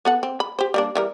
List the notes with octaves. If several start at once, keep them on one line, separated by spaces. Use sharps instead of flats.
B3 A4 F#5
C4
B5
G4 C5
G3 A#3 D4
E3 G3 A#4